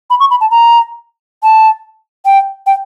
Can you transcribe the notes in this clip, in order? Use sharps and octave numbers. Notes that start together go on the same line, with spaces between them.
B5
C#6
B5
A5
A#5
A5
G5
G5